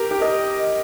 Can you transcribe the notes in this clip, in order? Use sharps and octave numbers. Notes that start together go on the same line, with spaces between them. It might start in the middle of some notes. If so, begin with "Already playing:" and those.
Already playing: G4 A#4
G4
A#4 D#5